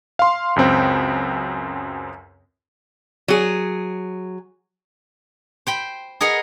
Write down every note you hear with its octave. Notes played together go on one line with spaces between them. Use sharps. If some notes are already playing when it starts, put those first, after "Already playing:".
F5 C6
C#2 F#2 C4 G5
F#3 G#4
C5 G5 B5
G#4 A#4 B4 D#5 F#5